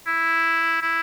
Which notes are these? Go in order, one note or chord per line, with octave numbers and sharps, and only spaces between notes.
E4
E4